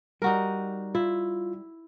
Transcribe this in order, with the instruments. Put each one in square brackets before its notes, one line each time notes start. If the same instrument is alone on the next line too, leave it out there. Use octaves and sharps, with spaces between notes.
[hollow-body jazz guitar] G3 [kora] D#4 F#4 A#4
[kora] E4 [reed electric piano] F4